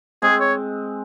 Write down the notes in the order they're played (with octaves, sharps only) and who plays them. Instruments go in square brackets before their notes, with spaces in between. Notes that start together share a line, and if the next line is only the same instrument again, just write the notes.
[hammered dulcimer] G#3 C4 [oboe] G#4
[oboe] C#5